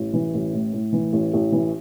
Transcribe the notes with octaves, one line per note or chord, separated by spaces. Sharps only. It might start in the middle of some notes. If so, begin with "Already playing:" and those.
Already playing: A1
E3
A1
A2
A2
E3
A1
A1
E3